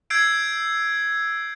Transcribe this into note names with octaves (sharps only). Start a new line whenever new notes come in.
E6 G6 G#6 C7 D7